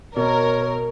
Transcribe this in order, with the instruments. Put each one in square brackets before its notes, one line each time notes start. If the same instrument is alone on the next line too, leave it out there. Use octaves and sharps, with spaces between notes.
[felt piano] B2 [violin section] A#4 [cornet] C#5